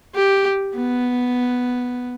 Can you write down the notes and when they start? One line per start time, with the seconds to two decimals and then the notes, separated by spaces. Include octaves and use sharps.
0.15 G4
0.76 B3